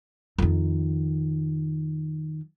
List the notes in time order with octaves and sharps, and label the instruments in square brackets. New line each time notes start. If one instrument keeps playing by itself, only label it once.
[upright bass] F2 D#3